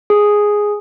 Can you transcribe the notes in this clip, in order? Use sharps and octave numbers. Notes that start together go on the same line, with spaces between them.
G#4